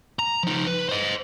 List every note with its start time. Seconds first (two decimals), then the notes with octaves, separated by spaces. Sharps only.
0.19 A#5
0.43 F3 D#4
0.67 B4
0.89 C5 D#5